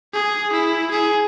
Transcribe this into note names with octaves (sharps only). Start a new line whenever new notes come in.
G#4
E4
G#4